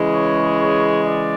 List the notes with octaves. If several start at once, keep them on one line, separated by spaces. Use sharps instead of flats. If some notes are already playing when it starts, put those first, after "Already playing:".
Already playing: C#3 E3 G#3
C#5
C#5
D5